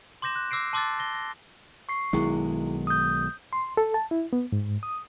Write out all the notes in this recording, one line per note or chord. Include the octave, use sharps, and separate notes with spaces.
C6 D6 G6 A#6 E7
F#6
D6 E6 A#6 C7 D7
A5 C6 D6 E6 F#6 A6
A#6 G7
A#6
C#6 C7
B1 D#3 G#3 E4 G#4
D#6 G6
C6
A4
A5
E4
B3
G#2
D#6